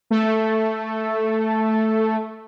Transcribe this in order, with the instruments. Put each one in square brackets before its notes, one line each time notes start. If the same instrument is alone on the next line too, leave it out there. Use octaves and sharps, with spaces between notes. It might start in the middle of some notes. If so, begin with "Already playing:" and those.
[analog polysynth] A3 A4